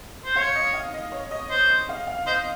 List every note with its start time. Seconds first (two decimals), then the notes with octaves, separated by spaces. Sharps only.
0.25 C5
0.36 C#5 F5
0.55 D#5
0.74 F5
0.94 D#5
1.12 C#5
1.31 D#5
1.50 C5
1.89 F5
2.07 F5
2.26 C5 D#5